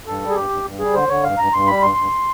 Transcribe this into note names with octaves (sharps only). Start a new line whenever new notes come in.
G2 A4
G3
G#4
G2 G4
G2
G2
G3 G#4
D3 C5
D3 C#5
G2 F5
G2 A#5
G2 C6
G3 B5
G2 C6
G2